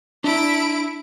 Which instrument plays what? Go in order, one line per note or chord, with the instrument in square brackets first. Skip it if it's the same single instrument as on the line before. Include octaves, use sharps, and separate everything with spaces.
[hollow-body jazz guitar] D4 D5 A#5 [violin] E4 D7